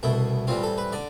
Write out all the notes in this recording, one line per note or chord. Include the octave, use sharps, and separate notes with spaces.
C2 B2 A3 E4
A2 E3 G3 C4 F4
A4
B4
D3 D5